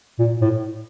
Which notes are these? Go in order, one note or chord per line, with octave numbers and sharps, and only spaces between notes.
A#2
A2